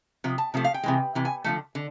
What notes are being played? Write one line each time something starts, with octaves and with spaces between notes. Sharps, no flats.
C3 F3
A5
C3 F3 A3
F5
G5
C3 E3 G#3
C3 E3
G#5
D3 F3 A3
D3